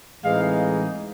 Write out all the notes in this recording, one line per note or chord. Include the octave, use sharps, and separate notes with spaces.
A2 E3 G#3 C4 D#4 F5